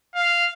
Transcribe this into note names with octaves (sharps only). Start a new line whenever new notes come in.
F5